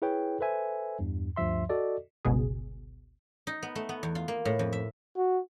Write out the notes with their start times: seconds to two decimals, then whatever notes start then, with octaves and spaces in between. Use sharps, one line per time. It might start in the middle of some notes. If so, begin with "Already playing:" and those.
0.02 E4 G#4 B4 C#5 G5
0.40 A4 B4 C5 E5 G#5
0.99 E2 G2
1.36 D2 G2 F3 E5 C6
1.69 F#4 A4 D5 D#5
2.25 G1 C#2 B2 G#4
3.47 D#4
3.62 B3
3.75 A3
3.89 B3
4.03 E2
4.15 F4
4.28 A#3
4.45 A2
4.59 F2
4.73 E5
5.17 F#4